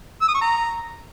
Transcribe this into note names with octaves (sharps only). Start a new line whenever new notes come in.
E6
D#6
C#6
A#5